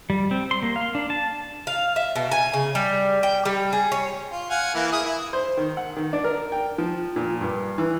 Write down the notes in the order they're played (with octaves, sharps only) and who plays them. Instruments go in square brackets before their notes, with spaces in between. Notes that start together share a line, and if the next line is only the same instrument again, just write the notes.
[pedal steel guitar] G3
C4
C6
A#3
F5
D4
A5
[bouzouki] F5
E5
B2
G#5
C#3
G3
G5
G3
G#4
C#5
[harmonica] F4
F5 F#5 G#5
E3 A#3 E4
E4 G#4 D#6
E4
[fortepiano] C5
D#3
F#5
D#3
D4
A#4
G5
F3
A#2
G2
E3